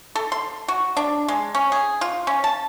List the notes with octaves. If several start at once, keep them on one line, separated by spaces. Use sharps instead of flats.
A4
C6
F#4
D4
G#3
C#4
G#4
F4
C#4
A5